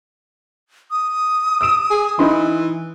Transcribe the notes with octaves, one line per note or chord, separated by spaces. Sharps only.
D#6
E6 D7 E7
G#4
E3 D#4 B5 C6